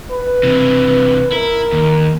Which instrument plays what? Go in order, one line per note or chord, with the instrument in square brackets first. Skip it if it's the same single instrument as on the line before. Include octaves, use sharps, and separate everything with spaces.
[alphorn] B4
[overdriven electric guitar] C3 E3
[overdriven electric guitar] E4 [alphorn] A#4
[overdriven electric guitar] D#2